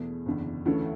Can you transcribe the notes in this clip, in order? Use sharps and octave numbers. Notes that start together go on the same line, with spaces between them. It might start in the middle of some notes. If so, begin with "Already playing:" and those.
Already playing: E2 B2 A3 G#4
F#1 E2 D3
D2 C#3 E3 A3 C#4